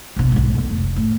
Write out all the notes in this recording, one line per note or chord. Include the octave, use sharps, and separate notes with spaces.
A#1 B2
B1 G#2
D3 B3
F1
A2